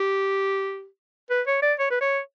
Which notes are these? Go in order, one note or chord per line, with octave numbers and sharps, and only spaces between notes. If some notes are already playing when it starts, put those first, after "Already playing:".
Already playing: G4
B4
C#5
D5
C#5
B4
C#5